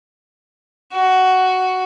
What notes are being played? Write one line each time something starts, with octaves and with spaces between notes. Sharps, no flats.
F#4